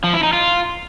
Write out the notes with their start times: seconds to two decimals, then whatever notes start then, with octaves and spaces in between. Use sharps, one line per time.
0.04 F3
0.13 E4
0.23 D#4
0.33 F4